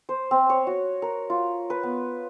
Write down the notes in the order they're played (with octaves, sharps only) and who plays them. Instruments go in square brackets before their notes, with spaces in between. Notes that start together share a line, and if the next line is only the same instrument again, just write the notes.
[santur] C5
C4
C#5
F#4
A#4
F4
B4
B3